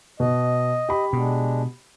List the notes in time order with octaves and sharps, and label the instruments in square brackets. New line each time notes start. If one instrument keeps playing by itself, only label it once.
[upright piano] B2 [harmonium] D#5
[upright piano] G4 B5
[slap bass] B2 [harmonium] G#3 D4